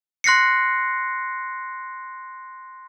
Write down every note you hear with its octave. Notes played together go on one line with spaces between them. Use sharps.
C6 F#6 A#6 C7 C#7